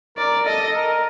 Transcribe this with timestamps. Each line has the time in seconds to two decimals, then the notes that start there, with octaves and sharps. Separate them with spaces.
0.18 A#4 D5
0.46 A4 D#5
0.75 A#4